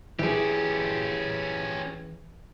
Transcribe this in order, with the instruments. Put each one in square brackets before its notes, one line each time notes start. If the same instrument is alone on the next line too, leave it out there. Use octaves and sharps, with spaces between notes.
[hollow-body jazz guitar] E3 G#4 [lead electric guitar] C#4 G4